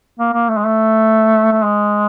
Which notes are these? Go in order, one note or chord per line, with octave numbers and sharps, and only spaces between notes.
A#3
A#3
A3
G#3
A3
A3
G#3